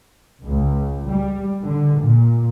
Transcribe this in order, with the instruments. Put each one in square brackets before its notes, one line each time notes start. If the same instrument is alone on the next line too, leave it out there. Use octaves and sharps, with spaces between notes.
[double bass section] C#2
G3
D3
A#2